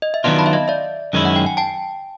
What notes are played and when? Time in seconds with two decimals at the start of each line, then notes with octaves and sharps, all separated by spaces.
0.02 D#5
0.14 E5
0.24 D#3 F#3 B3 D4 F4 D#5 F5
0.39 A5 B5
0.46 E5
0.53 D#5 F5
0.68 D5 E5
1.13 F#2 D#3 G#3 C#4 E4
1.25 F#5
1.36 G5
1.46 G#5
1.57 G5 A5